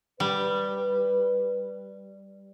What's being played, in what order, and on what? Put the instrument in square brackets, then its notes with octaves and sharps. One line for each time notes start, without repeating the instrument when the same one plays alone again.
[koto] G3 [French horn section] B4